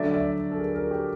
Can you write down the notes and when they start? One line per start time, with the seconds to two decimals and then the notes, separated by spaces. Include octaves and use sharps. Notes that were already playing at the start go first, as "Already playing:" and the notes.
Already playing: D3 F#3 A3 D5 E5
0.14 D5 E5
0.51 A4
0.58 G#4 A#4
0.75 G#4 A#4
0.91 G4 A4